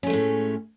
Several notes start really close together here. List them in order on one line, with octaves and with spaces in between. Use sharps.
C#4 A3 G#3 A2